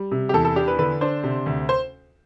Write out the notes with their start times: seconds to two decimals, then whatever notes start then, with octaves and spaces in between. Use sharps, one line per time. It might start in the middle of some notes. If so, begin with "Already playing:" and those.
Already playing: G3
0.12 C3
0.29 G4
0.34 E2 A4
0.45 A4
0.56 D4 G4
0.68 B4
0.78 D3 B4
1.01 D4 C5
1.24 C3
1.46 D2
1.69 C5